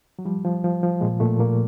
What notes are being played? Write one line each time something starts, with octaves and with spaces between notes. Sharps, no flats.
F#3
F3 G3
F3
F3
F3
A#2 G#3
A#2 A3
A#2 A#3